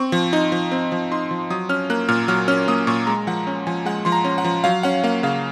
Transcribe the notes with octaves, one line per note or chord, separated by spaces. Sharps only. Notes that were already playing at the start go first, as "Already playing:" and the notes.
Already playing: C4 C#6
F3
D#4
F3
C4
F3
D#4 C6
F3
F#3 D#6
C#4 F6
A#3 F#6
A#2 F6
F#3 F6
C#4 F6
A#3 D#6
A#2 C#6
G#3 A#5
F3 F#5
C#4
F3 G#5
G#3 F#5
F3 C6
A#5
C#4
F#5
F3
F#3 F5
C#4 F#5
A#3 F5
C#3 F5